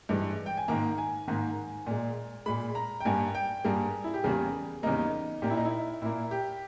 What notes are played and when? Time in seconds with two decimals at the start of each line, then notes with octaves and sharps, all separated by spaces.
0.09 G2 E3 G#3
0.46 G5
0.57 G#5
0.68 G#2 D#3 A#3 A#5
0.98 G#5
1.28 G#2 D#3 A#3
1.87 A#2 G#3
2.46 A#2 G#3 B5
2.75 A#5
3.00 G5
3.05 G2 G3 A#3 G#5
3.35 G5
3.64 G2 G3 A#3 G#4
4.04 E4
4.14 G4
4.24 E2 C#3 G3 A#3 G#4
4.83 E2 C#3 G3 A#3 D#4
5.42 A#2 A#3 G4
5.50 E4
5.57 D#4
5.65 E4
6.02 A#2 A#3 E4
6.31 G4